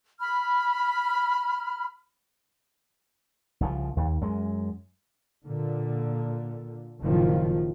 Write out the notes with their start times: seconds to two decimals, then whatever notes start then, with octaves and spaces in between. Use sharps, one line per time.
0.20 B5 F6
3.61 C2 C#3 F3
3.97 D#2
4.21 F#2 G#3
5.45 A#2 D3
7.02 F#1 A#2 D#3 F3